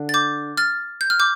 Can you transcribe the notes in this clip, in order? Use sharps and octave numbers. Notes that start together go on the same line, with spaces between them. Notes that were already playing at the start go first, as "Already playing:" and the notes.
Already playing: D3 D4
A6
D6 G6
F6 A6
G6
F6
D6 G6